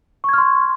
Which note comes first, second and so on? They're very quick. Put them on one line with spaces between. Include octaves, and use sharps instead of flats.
C#6 G#6 F6 C6